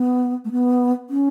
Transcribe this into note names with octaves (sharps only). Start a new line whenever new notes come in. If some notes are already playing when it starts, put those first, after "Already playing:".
Already playing: B3
A3
B3
C#4